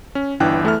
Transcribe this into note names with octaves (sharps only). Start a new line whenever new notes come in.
C#4
G1 E3 D4 E4 G5 F#6
E2 A3 E4 A4 E5 F6